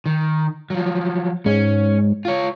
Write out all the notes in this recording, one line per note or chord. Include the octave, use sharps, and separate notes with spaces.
D#3
F3 F#3
G#2 C#4
F4 C#5